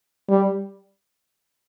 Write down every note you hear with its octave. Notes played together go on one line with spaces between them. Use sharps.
G3